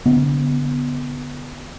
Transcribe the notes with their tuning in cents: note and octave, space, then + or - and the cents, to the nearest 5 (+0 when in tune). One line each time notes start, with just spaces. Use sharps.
D3 -35 B3 +0